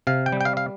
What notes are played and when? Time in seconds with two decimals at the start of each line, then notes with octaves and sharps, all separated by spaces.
0.07 C3 F5
0.26 G5
0.32 G3
0.41 G5
0.45 F5
0.57 F5